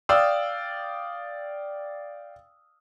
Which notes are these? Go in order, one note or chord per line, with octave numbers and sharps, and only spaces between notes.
D5 F5 G5 D#6 E6